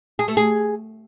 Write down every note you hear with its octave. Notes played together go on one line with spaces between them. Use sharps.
G#4
A3
G#4